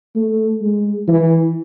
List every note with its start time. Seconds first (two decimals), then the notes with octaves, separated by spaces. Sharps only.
0.16 A3
0.61 G#3
1.08 E3